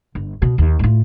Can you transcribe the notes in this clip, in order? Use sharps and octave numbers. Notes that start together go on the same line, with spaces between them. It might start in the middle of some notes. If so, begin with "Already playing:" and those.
G1
B2
D#2
A2 F4